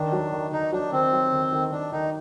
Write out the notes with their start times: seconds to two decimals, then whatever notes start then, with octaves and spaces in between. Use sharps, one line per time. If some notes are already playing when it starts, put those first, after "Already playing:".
Already playing: D#3 D4
0.12 F#3
0.33 D#3
0.52 D#3 D#4
0.72 F#3 D4
0.92 D#3 C4
1.12 F#3
1.32 D#3
1.52 D#3
1.72 D#3 D4
1.92 D#3 D#4